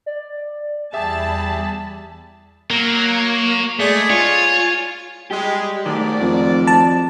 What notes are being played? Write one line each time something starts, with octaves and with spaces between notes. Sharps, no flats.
D5
E2 G3 G4 G#4 E5 A5 B5
F#3 A#3
G#3 A3 G#4 D5
F4 C#5 G#5
G3 G#3 G4
G#2 D#3 F#3 A3 A#4 D5
F2
A5